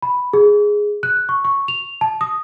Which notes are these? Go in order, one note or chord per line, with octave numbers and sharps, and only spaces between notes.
B5
G#4
F#6
C#6
C#6
F7
A5
D#6